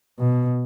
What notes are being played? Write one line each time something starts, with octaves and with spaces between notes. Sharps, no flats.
B2